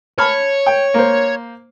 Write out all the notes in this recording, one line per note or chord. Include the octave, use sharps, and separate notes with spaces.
C#5 A5 B5 F6
G5
A#3 C5